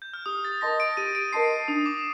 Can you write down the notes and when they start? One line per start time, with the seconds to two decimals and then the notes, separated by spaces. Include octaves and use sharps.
0.02 G6
0.14 F6
0.26 G4 D#6
0.45 A6
0.61 A#4 D#5 A5 C6 A#6
0.80 D7
0.97 G4 D#7
1.15 D7
1.33 A#4 D#5 A5 C6 C7
1.68 D4 D#6
1.86 D6